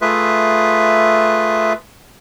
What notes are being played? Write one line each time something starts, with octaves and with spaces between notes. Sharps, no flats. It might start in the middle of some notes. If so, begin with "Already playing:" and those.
A3 F4 G#4 B4 E5